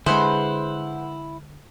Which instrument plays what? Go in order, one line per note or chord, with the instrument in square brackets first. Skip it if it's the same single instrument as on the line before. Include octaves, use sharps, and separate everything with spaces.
[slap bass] D3 G#3 [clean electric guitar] E4 [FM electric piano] G#4 B4 F#5 [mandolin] C5